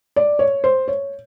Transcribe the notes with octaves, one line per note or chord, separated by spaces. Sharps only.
D5
C#5
C5
C#5